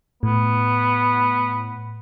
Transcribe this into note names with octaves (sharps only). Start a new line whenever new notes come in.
A2 B3